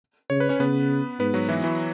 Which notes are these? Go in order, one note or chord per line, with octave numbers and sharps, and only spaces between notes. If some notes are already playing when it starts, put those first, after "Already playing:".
C#3 C#5
B4
C#4 C#5
C#3 B3 B4
G#2 B3 B4
F#3 F#4
E3 E4
E3 E4